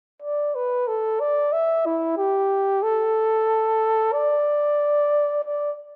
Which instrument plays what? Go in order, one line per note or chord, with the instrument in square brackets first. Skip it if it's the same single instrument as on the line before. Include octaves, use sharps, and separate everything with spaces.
[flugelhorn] D5
B4
A4
D5
E5
E4
G4
A4
D5
D5